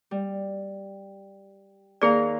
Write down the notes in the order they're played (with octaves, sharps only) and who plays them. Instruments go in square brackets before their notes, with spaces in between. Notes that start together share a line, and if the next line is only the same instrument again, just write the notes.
[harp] G3
[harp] D#2 A#4 F5 [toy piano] G#4 D5